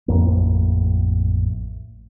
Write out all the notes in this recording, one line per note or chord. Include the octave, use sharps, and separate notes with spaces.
A1 F2 A#3